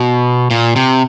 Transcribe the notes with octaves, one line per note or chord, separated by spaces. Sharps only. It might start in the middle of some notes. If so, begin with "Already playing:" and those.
Already playing: B2
A#2
C3